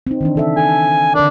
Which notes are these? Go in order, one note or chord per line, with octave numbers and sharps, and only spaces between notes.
C4 D#4
D#3 E3 D4
C#3 A4 E5
A4 G#5
D3 D4 A#4